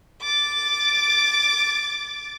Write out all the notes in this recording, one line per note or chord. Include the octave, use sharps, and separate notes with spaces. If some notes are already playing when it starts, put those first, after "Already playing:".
D6 A6